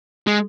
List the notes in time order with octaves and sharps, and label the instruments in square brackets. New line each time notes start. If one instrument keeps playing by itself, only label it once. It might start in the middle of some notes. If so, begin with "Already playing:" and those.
[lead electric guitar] G#3